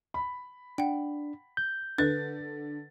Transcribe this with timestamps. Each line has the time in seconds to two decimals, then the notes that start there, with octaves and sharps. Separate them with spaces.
0.14 B5
0.78 D4 F#5 G5
1.57 G6
1.98 D3 B4 F#6 A6